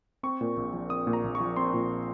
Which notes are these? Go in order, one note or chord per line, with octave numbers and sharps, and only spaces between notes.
C4 C#6
A#2
A#1
F3
C4 D#6
A#2
A#5
A#1
C#6
F3
C4 C6
A#2